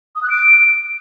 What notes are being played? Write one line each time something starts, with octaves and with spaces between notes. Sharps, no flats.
D#6
F#6
D7